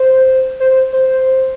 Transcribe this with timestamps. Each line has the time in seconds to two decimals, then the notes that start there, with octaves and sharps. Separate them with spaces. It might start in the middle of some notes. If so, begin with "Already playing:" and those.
Already playing: C5
0.60 C5
0.71 C5
0.93 C5